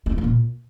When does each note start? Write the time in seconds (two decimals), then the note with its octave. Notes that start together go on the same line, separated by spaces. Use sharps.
0.06 A#3
0.12 B3
0.18 A#3
0.24 A#2